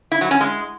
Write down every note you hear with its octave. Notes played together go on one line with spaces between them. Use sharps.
E4
F#3
C#4
G#3